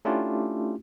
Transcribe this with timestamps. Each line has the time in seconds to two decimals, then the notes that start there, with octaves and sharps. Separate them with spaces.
0.05 A3 C#4 D4 E4 F4 G4